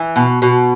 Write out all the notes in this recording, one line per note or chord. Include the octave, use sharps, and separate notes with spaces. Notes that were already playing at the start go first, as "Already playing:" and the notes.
Already playing: E3
B2
B2